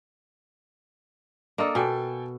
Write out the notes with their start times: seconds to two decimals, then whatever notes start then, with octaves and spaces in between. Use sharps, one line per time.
1.58 A#3 D4 A4 D#5 D#6
1.75 B2 A4 G5 G#5